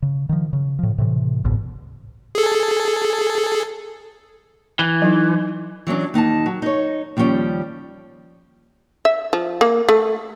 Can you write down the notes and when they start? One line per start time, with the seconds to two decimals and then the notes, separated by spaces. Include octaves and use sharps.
0.02 C#3
0.29 D#3 F3
0.53 C#3
0.79 A2 F3
0.98 A2 C3 E3
1.44 G#1 C#2 G#2 B2
2.35 G#4 A4
4.79 E3
5.02 F#3 D#4
5.87 E3 F#3 C#4 D4
6.14 D#2 D#4 G#5 A5
6.46 F#3
6.62 D#4 C#5
7.17 D#2 F3 G3 C#4 G5
9.05 E5
9.33 F3
9.61 A#3
9.89 A3